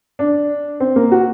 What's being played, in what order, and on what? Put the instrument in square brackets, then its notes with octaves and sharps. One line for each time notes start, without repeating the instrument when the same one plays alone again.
[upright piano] D4
C4
A#3
F#4